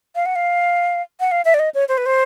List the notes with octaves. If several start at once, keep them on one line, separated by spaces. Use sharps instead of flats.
F5
F#5
F5
F#5
F5
E5
D5
D#5
C#5
C5
B4
C5